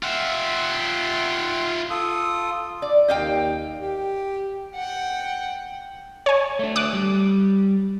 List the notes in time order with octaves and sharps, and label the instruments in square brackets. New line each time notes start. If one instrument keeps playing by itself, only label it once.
[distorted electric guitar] F4 E5 [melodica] F#5 G5 C6
[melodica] F4 A4 D#6
[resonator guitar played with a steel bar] D5
[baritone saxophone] D#2 [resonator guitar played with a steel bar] D#5 F5 G5
[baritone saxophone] G4
[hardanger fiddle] F#5 G5
[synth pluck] C#5 G#5
[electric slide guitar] A3 D4
[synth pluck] D6 D#6 F#6
[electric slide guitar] G3